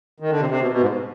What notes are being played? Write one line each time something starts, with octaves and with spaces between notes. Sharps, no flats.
D#3
D3
C3
C3
B2
B2
G#2